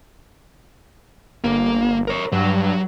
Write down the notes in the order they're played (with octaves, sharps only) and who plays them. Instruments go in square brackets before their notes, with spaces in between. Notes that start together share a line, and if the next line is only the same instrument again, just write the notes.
[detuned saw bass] G1 [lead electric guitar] A#3
[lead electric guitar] A#4 C#5
[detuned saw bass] G2 [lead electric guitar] F#3